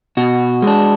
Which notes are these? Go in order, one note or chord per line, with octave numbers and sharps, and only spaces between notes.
B2 F#4
G#3 D4